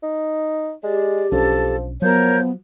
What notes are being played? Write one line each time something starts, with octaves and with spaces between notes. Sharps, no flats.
D#4
G#3 G4 D5
B1 F3 C#4 D4 A4
F3 F#3 B3 A#4 C#5 G6